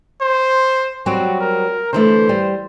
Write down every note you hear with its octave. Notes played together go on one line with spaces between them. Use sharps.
C5
F#3 G3 C4 F#4
A#4
D3 E3 A3 C5
G3